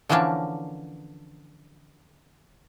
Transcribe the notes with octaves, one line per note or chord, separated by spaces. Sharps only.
D3 E3 F3 A#3 C#4 D4